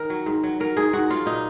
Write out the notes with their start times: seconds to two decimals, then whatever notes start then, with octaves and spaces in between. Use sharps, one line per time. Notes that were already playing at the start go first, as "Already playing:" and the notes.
Already playing: D#3 A#4
0.10 F#3
0.26 G#2
0.43 F#3
0.60 F#3 A#4
0.76 G#2 G#4
0.93 G#2 F#4
1.10 F#3 F4
1.26 A#2 D#4